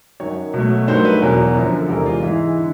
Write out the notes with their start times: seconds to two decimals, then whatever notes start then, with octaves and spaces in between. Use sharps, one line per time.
0.20 F#2 D#3 F#3 C#5
0.54 B2 F#3 A3
0.87 G2 D#3 F#3 A3 C5
1.05 B4
1.22 E2 B2 F#3 A#4
1.55 F#2 D3 F3
1.81 A4
1.89 E2 C3 E3 G#3 A#4
2.06 F4
2.22 G#2 E3 G#3 E4
2.57 D3